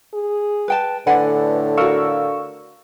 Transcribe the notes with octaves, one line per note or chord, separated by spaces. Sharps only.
G#4
B4 G5 A5
A2 D3 B4 D5 F#5 G#5
F#4 A#4 F5 C#6 E6